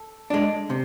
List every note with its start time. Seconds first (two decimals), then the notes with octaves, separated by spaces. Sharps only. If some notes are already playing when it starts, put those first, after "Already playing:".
Already playing: A4
0.30 G#3 D4
0.70 C3 C5